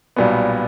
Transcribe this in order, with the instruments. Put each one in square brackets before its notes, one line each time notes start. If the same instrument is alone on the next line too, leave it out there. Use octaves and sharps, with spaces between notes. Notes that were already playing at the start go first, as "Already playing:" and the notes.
[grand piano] B1 A#2 G3 B3